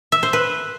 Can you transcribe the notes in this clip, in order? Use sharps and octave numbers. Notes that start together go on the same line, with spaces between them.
E5
C5
B4